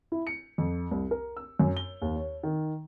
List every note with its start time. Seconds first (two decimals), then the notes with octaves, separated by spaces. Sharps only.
0.12 E4
0.27 C#7
0.58 F2
0.91 C2
1.11 A#4
1.37 E6
1.60 F#2
1.77 G7
2.02 D#2
2.16 C#5
2.43 D#3